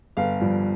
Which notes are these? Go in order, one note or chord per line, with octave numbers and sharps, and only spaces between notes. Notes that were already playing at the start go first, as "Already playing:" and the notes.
G1 F5
G2 F3